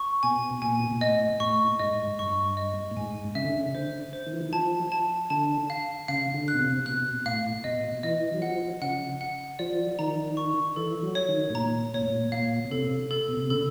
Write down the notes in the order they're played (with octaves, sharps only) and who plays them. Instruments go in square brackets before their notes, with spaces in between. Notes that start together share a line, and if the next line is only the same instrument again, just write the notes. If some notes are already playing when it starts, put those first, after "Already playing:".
Already playing: [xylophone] C#6
[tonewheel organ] B2 [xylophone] G#5
[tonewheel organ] A#2 [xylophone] G#5
[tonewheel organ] B2
A#2
[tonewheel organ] A2 [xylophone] D#5
[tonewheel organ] A2 [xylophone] C#6
[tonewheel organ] G#2 [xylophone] D#5
[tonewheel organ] G2 [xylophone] C#6
[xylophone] D#5
[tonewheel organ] A2
[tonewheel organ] G#2 [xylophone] G#5
[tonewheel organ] C#3 [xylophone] E5
[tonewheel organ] D3
C#3
[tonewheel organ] D3 [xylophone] C5
[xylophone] C5
[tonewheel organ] D#3
E3
D#3
[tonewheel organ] F3 [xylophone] A5
[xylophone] A5
[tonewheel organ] D3 [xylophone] A5
[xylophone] F5
[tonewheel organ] C#3 [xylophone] F5
[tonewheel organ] D3
[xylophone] F#6
[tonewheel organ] B2
C3
[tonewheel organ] B2 [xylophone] F#6
[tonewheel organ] A2 [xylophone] F5
[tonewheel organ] B2 [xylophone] D#5
[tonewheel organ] E3 [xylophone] D#5
[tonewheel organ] F#3
[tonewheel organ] F3 [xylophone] F#5
[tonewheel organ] C#3 [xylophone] F#5
[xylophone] F#5
[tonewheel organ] F3 [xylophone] D5
[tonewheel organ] D#3 [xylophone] A#5
[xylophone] C#6
[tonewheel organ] E3 [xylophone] A4
[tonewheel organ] F#3
[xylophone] C#5
[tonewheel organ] D#3
A2
[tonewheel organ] A#2 [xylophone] A#5
[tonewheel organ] A#2 [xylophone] C#5
[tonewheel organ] A2
A#2
[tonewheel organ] A#2 [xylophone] F5
[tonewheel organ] B2
[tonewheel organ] C3 [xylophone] A4
[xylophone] A4
[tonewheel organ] B2
C3
[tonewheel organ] C#3 [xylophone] A4